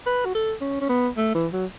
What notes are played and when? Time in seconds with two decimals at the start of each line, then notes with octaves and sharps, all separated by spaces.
0.06 B4
0.25 F#4
0.34 A4
0.61 C#4
0.81 C#4
0.89 B3
1.17 A3
1.35 E3
1.53 F#3